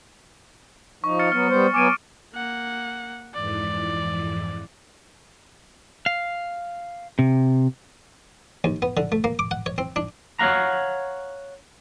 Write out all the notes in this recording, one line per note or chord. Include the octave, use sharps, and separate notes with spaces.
F3 D#4 C#6
F6 A6 C#7
F#3 B3 F6
G3 B3 C5
F#3 B3 G#5 D6 D7 D#7
A#3 F#5
F2 G#2 E3 D5
F5
C3
D#2
B3
D3
A3
A#3
D6
F#5
C#5
C4
D4
C#5 D#5 F5 F#5 A#5